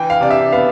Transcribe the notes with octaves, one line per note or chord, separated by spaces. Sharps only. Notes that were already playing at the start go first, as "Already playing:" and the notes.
Already playing: E3 G5
F5
C3 D5
E5
B3 F5